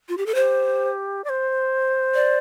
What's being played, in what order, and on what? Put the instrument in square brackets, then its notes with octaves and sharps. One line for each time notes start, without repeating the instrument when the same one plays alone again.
[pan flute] F4
G4
A4
[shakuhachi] G4 [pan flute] C5
[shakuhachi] D5
C5
[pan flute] D5